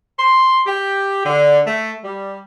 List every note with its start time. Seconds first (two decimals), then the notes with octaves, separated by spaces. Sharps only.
0.19 C6
0.67 G4
1.26 D3
1.67 A3
2.04 G3